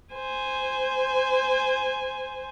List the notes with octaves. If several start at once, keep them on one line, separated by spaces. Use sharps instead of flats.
C5 G#5